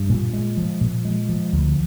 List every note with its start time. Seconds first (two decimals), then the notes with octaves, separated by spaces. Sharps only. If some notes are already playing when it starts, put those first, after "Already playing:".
Already playing: G2
0.09 A#2
0.33 G#3
0.57 F3
0.81 A#2
1.05 G#3
1.29 F3
1.53 D2